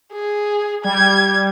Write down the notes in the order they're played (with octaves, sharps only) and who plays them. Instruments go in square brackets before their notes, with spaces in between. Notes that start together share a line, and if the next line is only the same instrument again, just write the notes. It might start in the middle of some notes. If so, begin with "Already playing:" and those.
[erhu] G#4
[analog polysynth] G3 [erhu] G#6